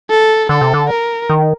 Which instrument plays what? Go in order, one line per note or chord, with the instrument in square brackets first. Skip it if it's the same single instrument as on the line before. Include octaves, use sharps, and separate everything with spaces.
[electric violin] A4
[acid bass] D3 [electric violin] A4
[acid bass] C3
D3
[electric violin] A#4
[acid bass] D#3